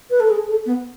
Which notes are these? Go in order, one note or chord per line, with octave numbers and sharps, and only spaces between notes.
B4
A4
G#4
A4
B3